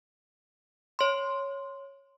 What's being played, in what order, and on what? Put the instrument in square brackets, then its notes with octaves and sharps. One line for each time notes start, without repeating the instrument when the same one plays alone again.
[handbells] C#5 C6